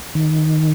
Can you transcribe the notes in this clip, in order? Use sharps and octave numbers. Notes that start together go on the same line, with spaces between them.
D#3